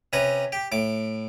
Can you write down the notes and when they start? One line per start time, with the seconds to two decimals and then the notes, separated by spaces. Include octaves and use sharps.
0.13 C3 C#4 B4 A#5
0.52 G4
0.72 A2 D6